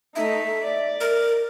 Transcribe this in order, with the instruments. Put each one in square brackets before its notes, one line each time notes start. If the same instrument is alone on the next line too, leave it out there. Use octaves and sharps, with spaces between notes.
[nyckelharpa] A3 D#4 [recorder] E5
[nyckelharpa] D5
[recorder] A#4